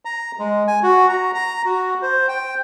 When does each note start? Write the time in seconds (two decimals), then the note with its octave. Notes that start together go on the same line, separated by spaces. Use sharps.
0.05 A#5
0.39 G#3
0.67 G#5
0.83 F#4
1.09 A#5
1.34 A#5
1.65 F#4
2.02 C5
2.29 G5